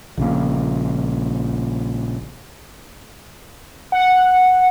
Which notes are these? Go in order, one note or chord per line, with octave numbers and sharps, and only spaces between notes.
A#1 C#3 A#3
F#5